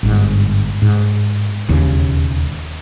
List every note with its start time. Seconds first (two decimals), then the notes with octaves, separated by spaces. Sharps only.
0.03 G1 G#2
0.82 G#2
1.69 E1 D#2 C#3